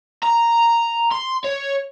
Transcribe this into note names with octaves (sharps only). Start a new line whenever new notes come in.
A#5
C6
C#5